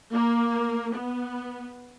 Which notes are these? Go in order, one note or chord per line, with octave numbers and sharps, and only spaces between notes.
A#3
B3